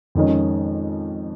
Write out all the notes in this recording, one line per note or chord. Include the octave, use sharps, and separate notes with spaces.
F2 D#3 G#3 C#4